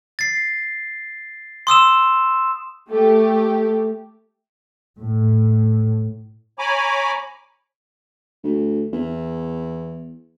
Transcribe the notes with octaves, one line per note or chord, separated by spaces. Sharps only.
A6 C7
C6 D#6 E6 E7
A3 G4
A2
C#5 G#5 A#5 B5 D6
D2
E2